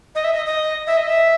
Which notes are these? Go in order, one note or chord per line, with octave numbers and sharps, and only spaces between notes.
D#5
E5
D#5
D#5
E5
D#5
E5